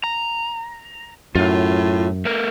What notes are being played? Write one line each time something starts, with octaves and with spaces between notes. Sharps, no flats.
A#5
F#2 A2 F4
A3 A#4